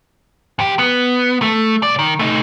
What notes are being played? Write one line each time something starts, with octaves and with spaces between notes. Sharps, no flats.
F2 G4
B3
A3
B1 D5
D#3
A3 D#4